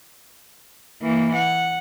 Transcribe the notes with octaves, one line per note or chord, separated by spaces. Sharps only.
E3 A#3
F#5